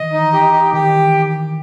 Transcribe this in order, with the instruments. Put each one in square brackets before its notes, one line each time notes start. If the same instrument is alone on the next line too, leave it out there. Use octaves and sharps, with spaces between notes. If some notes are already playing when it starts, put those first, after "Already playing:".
Already playing: [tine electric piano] D#3 E3 [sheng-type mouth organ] D#5
[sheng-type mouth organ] D#4
G4
G4
[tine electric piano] D#3 [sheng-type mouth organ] G4
[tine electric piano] E3